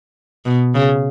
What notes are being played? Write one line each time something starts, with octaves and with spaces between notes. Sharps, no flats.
B2
C#3